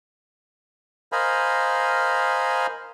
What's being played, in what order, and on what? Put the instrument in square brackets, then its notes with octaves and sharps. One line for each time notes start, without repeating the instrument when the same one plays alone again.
[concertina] A#4 C5 D#5 F5 G#5 B5